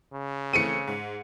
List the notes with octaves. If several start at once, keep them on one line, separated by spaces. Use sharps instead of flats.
C#3
E3 A3 C4 C#7 D#7
G#2